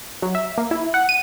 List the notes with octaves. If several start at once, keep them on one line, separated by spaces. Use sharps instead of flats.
F#3
E5
A#3
E4
F#5
D#7